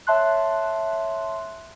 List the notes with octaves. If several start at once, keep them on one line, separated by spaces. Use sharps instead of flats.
C#5 E5 A5 C6 F#6